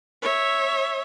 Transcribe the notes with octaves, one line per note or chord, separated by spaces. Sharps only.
C#5 E5